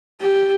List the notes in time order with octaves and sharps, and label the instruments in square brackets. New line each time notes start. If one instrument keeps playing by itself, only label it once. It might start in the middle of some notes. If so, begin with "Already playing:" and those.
[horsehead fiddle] G4